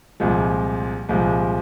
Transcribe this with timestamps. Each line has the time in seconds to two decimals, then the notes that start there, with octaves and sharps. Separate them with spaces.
0.20 C2 A#2 F3 G#3
1.09 C2 A#2 F3 G#3